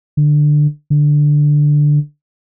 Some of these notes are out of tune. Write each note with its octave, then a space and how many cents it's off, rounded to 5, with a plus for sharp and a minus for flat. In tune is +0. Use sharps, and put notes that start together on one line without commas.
D3 +15
D3 +5